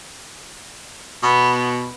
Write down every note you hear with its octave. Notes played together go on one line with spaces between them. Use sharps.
B2 B3